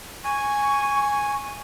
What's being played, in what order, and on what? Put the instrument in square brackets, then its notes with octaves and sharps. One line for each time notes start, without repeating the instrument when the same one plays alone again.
[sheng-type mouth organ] G#5 [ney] C#6